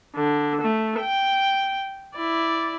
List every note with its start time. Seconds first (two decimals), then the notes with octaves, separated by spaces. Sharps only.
0.15 D3
0.61 A3
1.01 G5
2.16 E4 D5